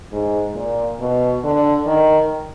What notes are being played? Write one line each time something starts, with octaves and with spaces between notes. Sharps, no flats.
G#2
A#2
B2
D3
D#3